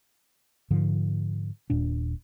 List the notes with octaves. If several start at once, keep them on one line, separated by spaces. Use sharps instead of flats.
G#2 D3 F3
D#1 A#2 D4